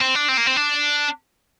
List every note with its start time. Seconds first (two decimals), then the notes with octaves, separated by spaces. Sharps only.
0.01 C4
0.15 D4
0.28 C4
0.37 A#3
0.47 C4
0.57 D4